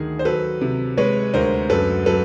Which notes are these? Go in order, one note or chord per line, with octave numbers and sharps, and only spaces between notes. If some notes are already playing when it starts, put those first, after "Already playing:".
Already playing: D2 D#3 G#4
C5
F#3 A4 B4
C3
G#3 B4 C#5
D2 A#4 C5
F#2 A4 B4
F#3 A4 B4